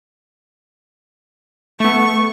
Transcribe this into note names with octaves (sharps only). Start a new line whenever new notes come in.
A3 B3 C#6